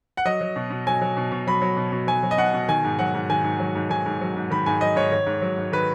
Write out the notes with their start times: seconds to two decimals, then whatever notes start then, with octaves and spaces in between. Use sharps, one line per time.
0.17 F#5
0.25 F#3 D#5
0.41 F#3
0.56 B2
0.70 B2
0.87 F#3 G#5
1.01 F#3
1.17 B2
1.32 B2
1.47 F#3 B5
1.62 F#3
1.77 B2
1.92 B2
2.07 F#3 G#5
2.23 F#3
2.31 D#5
2.38 B2 F#5
2.54 B2
2.68 D#3 G#5
2.84 G#2
2.99 F#3 F#5
3.14 G#2
3.30 D#3 G#5
3.44 G#2
3.60 F#3
3.75 G#2
3.90 D#3 G#5
4.06 G#2
4.21 F#3
4.36 G#2
4.51 D#3 B5
4.66 G#2 G#5
4.81 F#3 D#5
4.96 G#2 C#5
5.12 D#3 C#5
5.26 G#2
5.42 F#3
5.58 G#2
5.72 D#3 B4